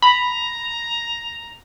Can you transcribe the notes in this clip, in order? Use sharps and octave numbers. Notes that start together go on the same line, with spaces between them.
A#5 B5